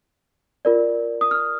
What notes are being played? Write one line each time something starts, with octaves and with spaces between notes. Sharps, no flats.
F4 A#4 D5
D#6
F6